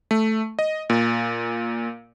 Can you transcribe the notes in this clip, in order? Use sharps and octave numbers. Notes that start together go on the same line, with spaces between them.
A3
D#5
A#2